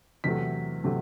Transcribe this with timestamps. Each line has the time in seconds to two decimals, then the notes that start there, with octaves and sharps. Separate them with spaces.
0.24 E2 C3 F#3 A3 B6
0.84 C3 F#3 A3